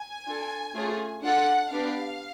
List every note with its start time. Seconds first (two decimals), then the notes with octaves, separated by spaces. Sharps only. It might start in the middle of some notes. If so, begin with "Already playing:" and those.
Already playing: G#5
0.26 D4 F4 A4
0.74 A3 C#4 F4 G#4
1.23 D4 F4 A4 F#5
1.71 B3 D4 G4 F5